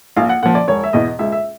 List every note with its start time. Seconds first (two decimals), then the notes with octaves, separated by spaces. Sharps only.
0.16 A#1 F5
0.29 F#5
0.43 A#2 F3 F#5
0.55 D5
0.68 E1 C#5
0.84 E5
0.93 E2 B2 D#5
1.19 C#2 E5
1.32 E5